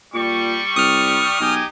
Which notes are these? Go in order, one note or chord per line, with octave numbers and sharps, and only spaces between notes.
A#2 G3 C#6
C2 D#6 F6
B1 D#4 G4 G#5